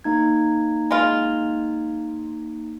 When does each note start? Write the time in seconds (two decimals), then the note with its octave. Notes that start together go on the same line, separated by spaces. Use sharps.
0.04 A#3 D#4 G#6
0.91 G#3 F4